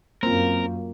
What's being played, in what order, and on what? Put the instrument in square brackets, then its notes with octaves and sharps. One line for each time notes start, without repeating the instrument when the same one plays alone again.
[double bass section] F#2 [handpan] A#3 F4 [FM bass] C4 [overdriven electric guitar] A#4